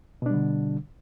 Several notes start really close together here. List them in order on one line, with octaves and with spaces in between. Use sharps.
B2 D4 G3 D3